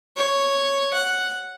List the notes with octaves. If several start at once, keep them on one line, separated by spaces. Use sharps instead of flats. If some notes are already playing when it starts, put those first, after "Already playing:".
C#5
F#5